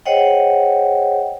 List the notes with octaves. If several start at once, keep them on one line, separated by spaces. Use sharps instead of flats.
G#4 C5 C#5 D#5 F#5 G5